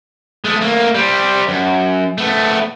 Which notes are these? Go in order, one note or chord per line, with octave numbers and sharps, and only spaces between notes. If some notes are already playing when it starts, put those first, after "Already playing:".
G#3 A3
A3 A#3
G3 C4
F#2
A3 B3